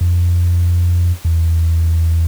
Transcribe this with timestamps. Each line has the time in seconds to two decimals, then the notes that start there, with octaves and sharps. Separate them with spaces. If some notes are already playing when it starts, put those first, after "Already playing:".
0.01 F2
1.25 E2